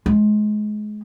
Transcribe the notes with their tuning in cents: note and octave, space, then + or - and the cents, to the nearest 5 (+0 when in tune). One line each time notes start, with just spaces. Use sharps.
G#3 +25